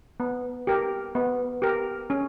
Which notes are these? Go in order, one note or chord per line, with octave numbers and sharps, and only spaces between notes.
B3
G4 A#4
B3
G4 A#4
C#4